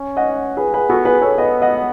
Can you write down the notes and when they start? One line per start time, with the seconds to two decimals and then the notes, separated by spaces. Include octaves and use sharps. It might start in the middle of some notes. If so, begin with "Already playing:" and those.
Already playing: C#4
0.17 D#5 F#5
0.57 G#4 B4
0.74 G#4 B4
0.89 B3 F#4 A4
1.05 G#4 B4
1.22 A4 C#5
1.38 B3 B4 D#5
1.62 D#5 F#5